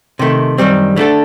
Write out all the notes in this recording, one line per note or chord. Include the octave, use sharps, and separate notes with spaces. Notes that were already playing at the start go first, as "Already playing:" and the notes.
C3 D#3 A3
F#2 D#3 G3 C4
D3 A3 D4 A4